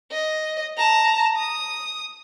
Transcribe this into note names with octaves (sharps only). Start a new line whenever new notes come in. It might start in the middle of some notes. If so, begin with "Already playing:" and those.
D#5
A5 A#5
D#6